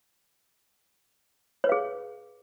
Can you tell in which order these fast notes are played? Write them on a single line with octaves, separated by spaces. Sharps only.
C#5 B4 F5 G#4